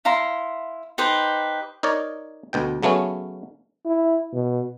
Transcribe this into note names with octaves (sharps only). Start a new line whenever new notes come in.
E4 F5 A#5 C6
D#4 G4 B4 C5
D#4 A#4 C#5 D5
D2 B2 G5
C#3 F#3 A3 B3 C#4
E4
B2